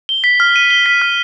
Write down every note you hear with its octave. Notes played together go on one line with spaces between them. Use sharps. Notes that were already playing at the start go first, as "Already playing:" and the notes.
G7
B6
F6
D#7
G7
B6
F6